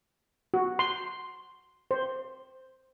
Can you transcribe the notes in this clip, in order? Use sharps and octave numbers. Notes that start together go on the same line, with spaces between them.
F#4
C6
C5